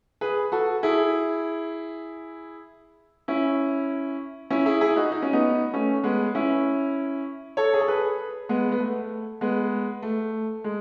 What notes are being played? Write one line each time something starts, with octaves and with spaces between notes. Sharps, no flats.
G#4 B4
F#4 A4
E4 G#4
C#4 E4
C#4 E4
E4 G#4
E4 G#4
D#4 F#4
D#4
C#4
B3 D#4
A3 C#4
G#3 B3
C#4 E4
A4 C#5
G#4
A4
G#4 B4
G#3 B3
B3
A3
G#3 B3
A3
G#3